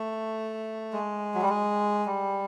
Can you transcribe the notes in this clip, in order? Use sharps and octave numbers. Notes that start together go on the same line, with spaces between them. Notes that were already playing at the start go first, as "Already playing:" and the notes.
Already playing: A3
G#3
F#3
G3
G#3
G3